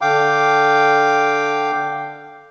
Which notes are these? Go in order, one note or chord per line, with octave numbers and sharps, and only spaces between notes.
D3 F5 G5 D6